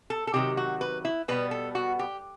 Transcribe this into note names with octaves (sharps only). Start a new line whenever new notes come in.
A4
A4
C3 D#3 F#3 G4
F#4
B4
E4
B2 G3 B3 B4
A4
F#4
G4